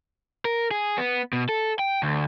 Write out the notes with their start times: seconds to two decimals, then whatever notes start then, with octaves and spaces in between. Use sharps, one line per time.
0.45 A#4
0.71 G#4
0.98 B3
1.33 B2
1.49 A4
1.79 G5
2.03 D2